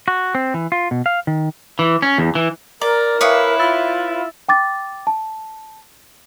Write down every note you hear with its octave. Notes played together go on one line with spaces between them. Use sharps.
F#4
C4
E3
F4
B2
F5
D#3
E3
C#4
E2
E3
A#4 D5 A#5
E4 B4 C#5 E5 F5 D6 D#6
F4 B5 E6 A6
G5 D6 A6
A5